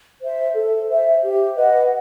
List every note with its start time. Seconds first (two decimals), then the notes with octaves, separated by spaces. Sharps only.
0.21 C5 E5
0.55 A4
0.89 C5 E5
1.23 G4
1.56 B4 D#5 F#5